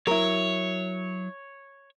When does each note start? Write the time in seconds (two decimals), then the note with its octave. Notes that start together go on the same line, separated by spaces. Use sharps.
0.07 F#3 E4 A#4 C#5